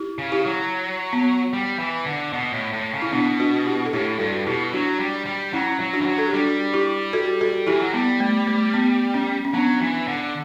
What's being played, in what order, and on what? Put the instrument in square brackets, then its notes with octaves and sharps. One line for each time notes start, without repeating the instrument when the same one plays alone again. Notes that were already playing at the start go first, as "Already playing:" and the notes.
Already playing: [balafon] E4 G4
[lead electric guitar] C#3
[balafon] E4 G4
[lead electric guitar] F#3
[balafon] B3
[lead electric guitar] G3
E3
D3
B2
A2
A2
C#3
[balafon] E4
[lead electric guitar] B2 [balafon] B3 D4
[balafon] D4 F#4
E4 G4
A4
[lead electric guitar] A2 [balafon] E4 G4
[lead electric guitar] G2 [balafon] F#4 A4
[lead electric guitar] B2 [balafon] E4 G4
[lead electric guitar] F#3 [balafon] D4 F#4
[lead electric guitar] G3
G3
[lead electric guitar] F#3 [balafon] C#4 E4
[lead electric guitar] F#3
[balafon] D4 F#4
[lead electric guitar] E3
F#3
[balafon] A4
G4
[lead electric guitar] G3 [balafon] D4 F#4
[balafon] E4 G4
F#4 A4
F#4 A4
[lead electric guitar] E3 [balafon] E4 G4
[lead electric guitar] F#3
[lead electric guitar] G3 [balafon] B3
[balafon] A3
A3
B3
C#4
C#4
[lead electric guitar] F#3 [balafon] B3 D4
[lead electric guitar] E3
D3